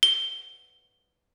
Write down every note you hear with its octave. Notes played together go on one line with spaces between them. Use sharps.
G7